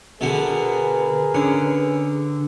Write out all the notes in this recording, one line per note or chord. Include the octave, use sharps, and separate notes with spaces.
B2 D3 B3 G#4 A#4 B4
D3 C#4